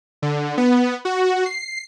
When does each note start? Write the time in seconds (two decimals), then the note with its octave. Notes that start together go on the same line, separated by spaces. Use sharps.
0.22 D3
0.58 B3
1.05 F#4
1.46 C7